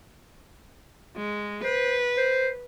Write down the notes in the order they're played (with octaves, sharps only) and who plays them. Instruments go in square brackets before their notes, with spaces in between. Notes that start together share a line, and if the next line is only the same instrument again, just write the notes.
[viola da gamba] G#3
[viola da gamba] B4 [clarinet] C5
[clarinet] C5